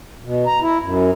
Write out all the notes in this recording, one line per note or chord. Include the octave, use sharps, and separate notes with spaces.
B2
A#5
E4
F#2